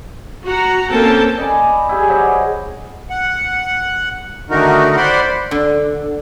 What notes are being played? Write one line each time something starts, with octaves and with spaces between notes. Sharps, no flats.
F#4 F#5 A#5
A#3 C4 C#4 A4 G5 A5
D5 D#5 G#5 B5
E4 G4 G#4
F#3 C5 D#5
F#5
D3 D#3 A3 D#4 F#4 A#4
C5 D5 F#5 B5 C6
D3